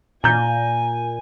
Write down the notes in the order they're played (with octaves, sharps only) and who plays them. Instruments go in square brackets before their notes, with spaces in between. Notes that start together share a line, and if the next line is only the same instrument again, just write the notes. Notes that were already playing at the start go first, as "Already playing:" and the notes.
[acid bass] A#2 [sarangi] G#5 [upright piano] A#5 G6